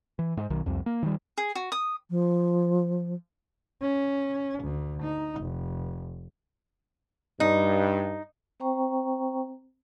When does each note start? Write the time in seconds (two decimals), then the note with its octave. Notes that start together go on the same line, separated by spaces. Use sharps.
0.19 E3
0.37 G#2
0.50 B1 D#3
0.66 C2 F2
0.86 A#3
1.03 D#3 G3
1.38 G#4
1.55 F#4
1.72 D#6
2.10 F3
3.81 C#4
4.64 D2
5.03 D#4
5.41 F1
7.40 G2 D#4
8.60 C4 C5 G5 A#5 C#6